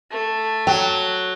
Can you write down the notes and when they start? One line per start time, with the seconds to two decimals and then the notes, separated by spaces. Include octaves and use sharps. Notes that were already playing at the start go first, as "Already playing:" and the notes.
0.11 A3
0.67 F#3 G5